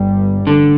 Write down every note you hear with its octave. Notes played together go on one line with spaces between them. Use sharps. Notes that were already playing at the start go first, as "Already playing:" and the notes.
Already playing: G1 G2 G3
A1 D3